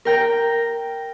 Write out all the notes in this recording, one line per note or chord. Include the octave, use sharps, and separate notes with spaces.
A#4 G5 A#5